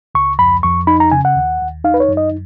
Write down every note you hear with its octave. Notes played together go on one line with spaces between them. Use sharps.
C#2 C#6
F2 B5
F2 C#6
D#4 B5
A#5
C#3 G#5
F#5
D#2
D#2
D#4 F5
B4
C#5
F#2
D#5